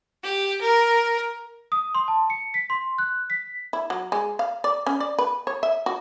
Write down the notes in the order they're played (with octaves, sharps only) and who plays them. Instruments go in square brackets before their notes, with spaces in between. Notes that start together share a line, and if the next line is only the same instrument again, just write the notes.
[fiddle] G4
A#4
[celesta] D#6
C6
A5
C#7
B6
C6
F#6
B6
[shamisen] E4
F#3
G#3
F5
D5
C#4
D5
B4
C#5
E5
F#4